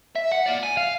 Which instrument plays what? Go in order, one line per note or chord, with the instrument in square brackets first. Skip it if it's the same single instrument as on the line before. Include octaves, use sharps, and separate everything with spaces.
[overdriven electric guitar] E5
F#5
A#3 D5
G#5
F5